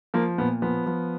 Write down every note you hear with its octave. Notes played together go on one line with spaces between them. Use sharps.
F3 A#3
A#2 B3
F3 B3
F3